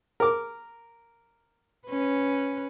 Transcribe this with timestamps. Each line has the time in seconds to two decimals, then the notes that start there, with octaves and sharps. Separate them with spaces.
0.20 A#4 D6
1.87 C#4 B4